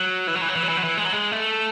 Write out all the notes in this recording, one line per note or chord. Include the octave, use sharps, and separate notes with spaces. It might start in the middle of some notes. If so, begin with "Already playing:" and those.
Already playing: F#3
E3
F#3
E3
F#3
E3
F#3
E3
F#3
E3
G#3
F#3
G#3
A3